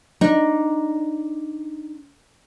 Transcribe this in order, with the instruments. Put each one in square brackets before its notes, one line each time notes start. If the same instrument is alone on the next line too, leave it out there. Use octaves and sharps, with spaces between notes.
[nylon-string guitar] D4 D#4